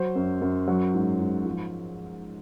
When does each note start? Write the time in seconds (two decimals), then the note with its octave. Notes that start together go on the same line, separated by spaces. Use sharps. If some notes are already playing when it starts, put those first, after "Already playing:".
Already playing: F#3 C5
0.16 F#2
0.41 F#2
0.68 F#3
0.94 G#2
1.20 G#2
1.46 F3